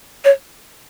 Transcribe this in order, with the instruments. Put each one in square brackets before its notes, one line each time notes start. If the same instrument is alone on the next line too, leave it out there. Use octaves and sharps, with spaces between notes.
[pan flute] C#5